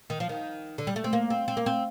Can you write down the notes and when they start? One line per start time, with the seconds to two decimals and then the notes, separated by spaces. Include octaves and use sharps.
0.10 D#3
0.20 F3
0.29 D#3
0.78 D3
0.87 G3
0.96 A3
1.04 C4
1.13 A#3
1.30 C4
1.48 C4
1.57 A#3
1.66 C4